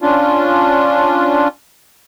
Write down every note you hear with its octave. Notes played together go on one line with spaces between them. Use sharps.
C#4 D4 F4